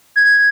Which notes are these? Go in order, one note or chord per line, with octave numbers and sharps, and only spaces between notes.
G#6